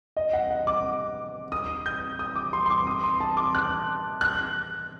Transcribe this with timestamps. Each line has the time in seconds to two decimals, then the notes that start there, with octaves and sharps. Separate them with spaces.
0.17 D#5
0.33 F#5
0.50 F#5
0.67 D6
1.52 D#6
1.86 G6
2.19 D#6
2.36 D6
2.53 C6
2.66 C6
2.70 D6
2.87 D#6
3.04 C6
3.20 A5
3.37 D6
3.55 F#6
4.21 F#6